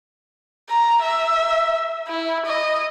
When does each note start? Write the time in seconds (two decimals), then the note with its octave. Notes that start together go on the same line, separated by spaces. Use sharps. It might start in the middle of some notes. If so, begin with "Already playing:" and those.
0.70 A#5
1.02 E5
2.08 E4
2.46 D#5